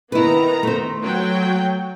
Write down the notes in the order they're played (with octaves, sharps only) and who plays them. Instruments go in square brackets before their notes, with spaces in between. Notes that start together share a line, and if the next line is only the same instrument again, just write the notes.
[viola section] D#3 B3 A#5 [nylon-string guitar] E4 B4
[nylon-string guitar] A3 C5
[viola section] F#3 G5